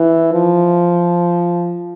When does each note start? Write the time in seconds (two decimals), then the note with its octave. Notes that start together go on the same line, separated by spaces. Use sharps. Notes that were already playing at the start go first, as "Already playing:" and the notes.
Already playing: E3
0.33 F3